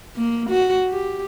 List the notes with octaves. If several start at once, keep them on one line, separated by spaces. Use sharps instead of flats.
A#3
F#4
G4